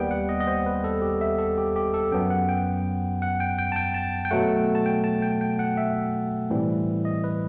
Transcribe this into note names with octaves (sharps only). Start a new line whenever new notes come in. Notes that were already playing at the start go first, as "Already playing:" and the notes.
Already playing: D#2 D#3 G3 B3 G5
F#5
D#5
D#5
C5
B4
A4
G4
E5
A4
G4
G4
A4
F#2 F#3 B3 G5
F#5
G5
F#5
G5
G5
A5
G5
A5
G5
B2 F#3 A3 F#5
A5
G5
A5
G5
G5
F#5
E5
A2 E3 G3 C4
D#5
B4